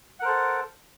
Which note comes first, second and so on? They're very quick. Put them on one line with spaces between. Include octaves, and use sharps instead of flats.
F#5 A#4 C5 A4